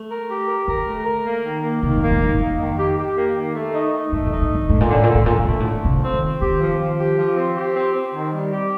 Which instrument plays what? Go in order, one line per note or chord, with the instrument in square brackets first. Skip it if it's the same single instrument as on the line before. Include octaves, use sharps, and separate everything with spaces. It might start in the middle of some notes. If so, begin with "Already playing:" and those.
Already playing: [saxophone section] A3
A#4
G4
A#4
[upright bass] D3 [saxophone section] A#4
[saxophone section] A3
A#4
A#3
D#3
A#3
[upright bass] C3 [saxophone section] D#3
[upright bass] A#2
[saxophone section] A#3
[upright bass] A2
[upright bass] G2 [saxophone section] D#4
[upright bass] F2 [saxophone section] A#3
[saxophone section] D#3
G4
G4
A#3
D#3
A3
D#4
D#4
[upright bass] G2 [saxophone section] A3
[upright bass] A2
[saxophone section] D#4
[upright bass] G2
[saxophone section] D3
[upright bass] G2
[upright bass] A2 [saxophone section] D3
[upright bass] A#2
[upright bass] A2 [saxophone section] D3
[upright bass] A#2 [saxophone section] D3
[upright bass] A2
[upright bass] A#2 [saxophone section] D3
[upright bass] A2
[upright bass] A#2 [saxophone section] A3
[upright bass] A2
[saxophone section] D3
[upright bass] C3 [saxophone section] F3
[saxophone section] C4
[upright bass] D#3
[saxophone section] C4
[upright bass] D#3 [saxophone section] G4
[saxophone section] F3
F3
G4
F3
C4
G4
C4
C4
D#3
G3
G4